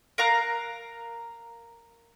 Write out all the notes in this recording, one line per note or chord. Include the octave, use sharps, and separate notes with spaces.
A#4 F5 A#5 F#6